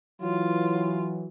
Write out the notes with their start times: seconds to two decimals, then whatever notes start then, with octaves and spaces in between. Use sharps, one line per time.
0.22 E3 F#3 F4